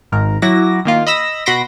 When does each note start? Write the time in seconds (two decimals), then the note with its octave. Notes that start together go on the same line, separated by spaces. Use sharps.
0.12 G#1 G#2 A#4 A#5
0.42 F#3 E4 F#4 D6 A#6
0.85 D#3 A#3 F4
1.06 D#5 B5 E6 A#6
1.46 B2 F#4 B5 C6 A#6 D7